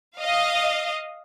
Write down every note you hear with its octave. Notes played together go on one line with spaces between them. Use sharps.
D#5 F5